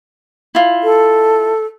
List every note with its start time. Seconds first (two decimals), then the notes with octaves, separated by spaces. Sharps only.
0.55 E4 F4
0.84 A4